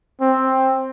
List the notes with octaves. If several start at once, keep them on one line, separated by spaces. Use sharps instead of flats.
C4